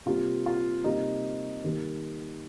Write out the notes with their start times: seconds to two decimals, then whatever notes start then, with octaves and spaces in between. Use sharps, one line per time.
0.06 C3 G3 A#3 F4
0.46 F4
0.84 C3 G3 A#3 D#4
1.64 D#3 G3 A#3